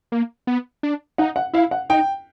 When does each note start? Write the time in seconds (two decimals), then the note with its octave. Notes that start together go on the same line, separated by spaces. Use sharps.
0.12 A#3
0.47 B3
0.83 D4
1.18 D#4 F#5
1.36 F#5
1.53 E4 F5
1.71 F#5
1.89 D#4 G5